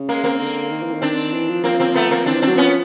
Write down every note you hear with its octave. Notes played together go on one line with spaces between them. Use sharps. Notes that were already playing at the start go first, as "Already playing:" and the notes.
Already playing: C#3
G#3 A#3
A#3 C4
D3
D#3
E3
D#3
C4 D4
E3
F3
F3 A#3 C4
A#3 C4
A3 B3
A#3 C4
E3 C4 D4
F#3 C4 D4
F3 B3 C#4